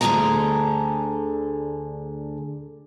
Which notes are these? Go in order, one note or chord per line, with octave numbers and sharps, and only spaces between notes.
D2 D3 E4 G#4 A4 A#5